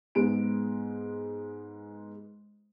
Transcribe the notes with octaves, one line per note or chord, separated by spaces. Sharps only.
G#2 G#3 B3 D7